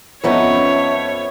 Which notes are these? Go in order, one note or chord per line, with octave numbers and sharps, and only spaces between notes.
F2 B3 C#4 D#4 B4 C#5 E5